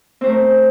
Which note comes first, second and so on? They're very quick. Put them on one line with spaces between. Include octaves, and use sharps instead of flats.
C4 C5 A3 A#4